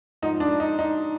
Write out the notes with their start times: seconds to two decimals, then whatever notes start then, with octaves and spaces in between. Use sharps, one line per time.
0.22 G#2 F3 D#4
0.40 D4
0.60 D#4
0.79 D#4